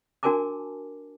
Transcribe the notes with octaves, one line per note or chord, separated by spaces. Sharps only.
D4 F#4 A#4 G#5 A5 D6